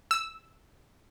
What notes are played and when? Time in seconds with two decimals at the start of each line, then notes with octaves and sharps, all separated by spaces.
0.11 E6